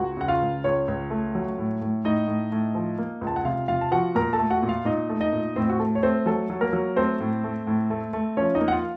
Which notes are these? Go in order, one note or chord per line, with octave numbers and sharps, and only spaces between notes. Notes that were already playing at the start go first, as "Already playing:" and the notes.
Already playing: C#2 F#4
C#3 F#5
F4 F5
C#2
C#2 C#4 C#5
C#2
A3
F#3
A2
A2
A2 D#4 D#5
A2
A2
F3
A#3
C#2
A5
F#5
C3 F4 F5
C3 F4 F5
A5
F3 F#4 F#5
A#2 A#4 A#5
A4 A5
A3
F#4 F#5
A#2
F4 F5
A#2 D#4 D#5
A3
D#4 D#5
A#2
A2 C4 C5
F#4
A3 A4
C#5
A3 C4 C5
F#3 A4
F#3
A#3 A#4
F#3
A3 C4 C5
A2
A3
A2
A3
A3
F3 C#4 C#5
D#4 D#5
A#3
F#5
F4 F5